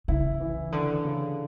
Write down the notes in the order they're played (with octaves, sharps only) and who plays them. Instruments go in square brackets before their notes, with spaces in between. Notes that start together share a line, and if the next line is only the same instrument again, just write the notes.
[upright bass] C#3 [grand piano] E4
[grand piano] E3
[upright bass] D3 [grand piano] E3
[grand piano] C#3